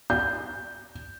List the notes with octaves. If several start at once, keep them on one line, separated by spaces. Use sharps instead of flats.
G6